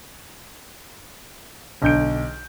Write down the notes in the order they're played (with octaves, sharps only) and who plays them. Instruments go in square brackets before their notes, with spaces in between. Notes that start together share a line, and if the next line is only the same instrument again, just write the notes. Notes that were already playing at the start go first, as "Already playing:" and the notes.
[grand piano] B1 D3 G6 D7